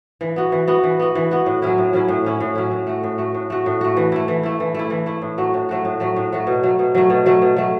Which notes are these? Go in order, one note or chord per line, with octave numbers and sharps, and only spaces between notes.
E3
B3 F#4
E3
B3 F#4
E3
B3 F#4
E3
B3 F#4
A2
F#3 C#4 E4
A2
F#3 C#4 E4
A2
F#3 C#4 E4
A2
F#3 C#4 E4
A2
A3 F#4
A2
A3 F#4
A2
A3 F#4
A2
A3 F#4
E3
A3 E4
E3
A3 E4
E3
A3 E4
E3
A3 E4
A2
F#3 A3 F#4
A2
F#3 A3 F#4
A2
F#3 A3 F#4
A2
F#3 A3 F#4
B2
F#3 A3
B2
F#3 A3
B2
F#3 A3
B2
F#3 A3